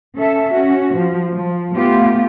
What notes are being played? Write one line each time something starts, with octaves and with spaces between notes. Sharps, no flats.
C#4 A4 E5
C#4 F#4
F3
F3
A3 B3 F4 G4